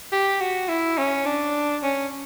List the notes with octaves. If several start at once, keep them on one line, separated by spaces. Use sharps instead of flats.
G4
F#4
E4
C#4
D4
C#4